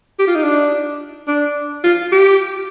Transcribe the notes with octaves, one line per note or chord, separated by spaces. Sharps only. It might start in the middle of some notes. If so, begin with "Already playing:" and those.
G4
F4
D#4
D4
D4
F4
G4